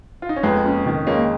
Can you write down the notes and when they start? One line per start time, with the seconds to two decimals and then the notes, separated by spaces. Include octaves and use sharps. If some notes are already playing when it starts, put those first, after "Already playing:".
0.22 F4
0.29 D#4
0.36 C#4
0.43 F2 G#3 B3
0.65 C#4
0.86 D#3
1.07 G#3 A#3 C#4